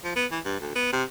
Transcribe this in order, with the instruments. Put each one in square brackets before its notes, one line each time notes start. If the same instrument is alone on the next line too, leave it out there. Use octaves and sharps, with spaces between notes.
[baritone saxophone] F3
B3
E3
G2
D2
B3
C3